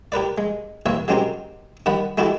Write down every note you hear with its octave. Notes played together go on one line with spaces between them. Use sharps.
G4 A#4 B4 D5
G#3
C2 E3 A#3 C#5 E5
F#3 G#3 C4 C#4 G4 A#4
D#3 G3 F#5 B5
G#3 E4 F#4 G4 A4